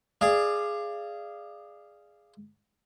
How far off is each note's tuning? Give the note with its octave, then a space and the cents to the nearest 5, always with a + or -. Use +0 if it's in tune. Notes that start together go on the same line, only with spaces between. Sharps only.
G#4 +0 D5 +20 F5 -20